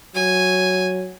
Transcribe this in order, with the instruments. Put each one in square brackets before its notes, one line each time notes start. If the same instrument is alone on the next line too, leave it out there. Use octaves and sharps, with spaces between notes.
[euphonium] F#3 [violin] G#5